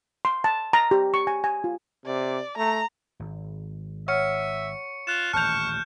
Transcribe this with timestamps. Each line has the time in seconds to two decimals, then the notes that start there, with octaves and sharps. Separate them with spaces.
0.25 C6
0.44 A5
0.73 A#5
0.91 G4
1.14 C#6
1.27 G#5
1.44 G#5
1.64 F4
2.06 C3 D5
2.57 A3 A#5
3.20 G#1
4.08 C#5 E5 F#5 C#6 F6 C#7
5.07 F4 F#6 E7
5.33 D#1 A1 A5 C#6 F6 G6 F7